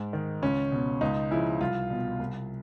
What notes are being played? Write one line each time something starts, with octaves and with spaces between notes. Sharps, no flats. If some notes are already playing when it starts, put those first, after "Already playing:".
Already playing: G#2
D#3
C#2 C#4
B2
C#2 D#4
C#3 F3 E4
C2 F4
B2
C2